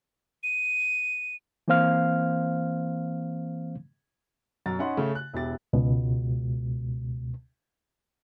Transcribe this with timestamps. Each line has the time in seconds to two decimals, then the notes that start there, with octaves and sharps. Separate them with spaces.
0.43 D#7
1.68 E3 A#3 C4 C5 F5 F6
4.66 F#2 B2 A#5 A6
4.79 C#4 D#4 F#5 B5 C6
4.97 C#3 A3
5.15 F#6
5.33 E1 E4 G4 A6
5.73 C#2 B2